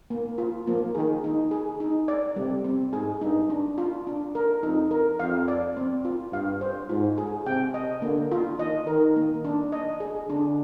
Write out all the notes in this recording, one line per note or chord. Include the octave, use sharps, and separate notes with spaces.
A#3
F4
F3 A#3
D#3 G#4
D#4
G#4
D#4
D5
C3 G3
C4
G#2 G#4
G2 D#4
D4
F4
D4
A#4
F2 D#4
A#4
F2 F5
D5
C4
F4
G2 F5
C5
G#2 F4
G#4
C3 G5
D#5
D3 A#3
F4
D#3 D#5
D#3 A#4
A#3
D4
D#5
G#4
D3 D4